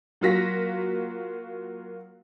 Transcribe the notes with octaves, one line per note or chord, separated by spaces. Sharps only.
F#3 A#3 F4 F#4 A#6 B6